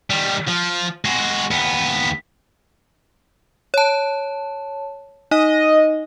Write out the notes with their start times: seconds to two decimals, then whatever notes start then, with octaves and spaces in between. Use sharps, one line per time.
0.10 D#3 G3
0.48 F3
1.05 G#3 F#4
1.51 D#2 B3
3.74 C#5 A5
5.31 D#4 D#5